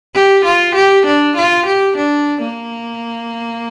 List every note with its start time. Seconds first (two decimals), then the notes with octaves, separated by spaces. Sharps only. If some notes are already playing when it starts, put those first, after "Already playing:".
0.14 G4
0.44 F4
0.75 G4
1.05 D4
1.36 F4
1.65 G4
1.97 D4
2.41 A#3